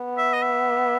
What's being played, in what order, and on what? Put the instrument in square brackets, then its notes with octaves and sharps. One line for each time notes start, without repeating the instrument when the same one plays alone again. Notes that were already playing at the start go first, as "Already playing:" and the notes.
Already playing: [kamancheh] B3
[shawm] E5
D#5
E5